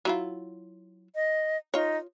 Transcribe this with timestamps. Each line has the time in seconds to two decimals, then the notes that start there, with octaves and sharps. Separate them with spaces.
0.05 F#3 E4 F4
1.15 D#5
1.74 D#4 F4 C#5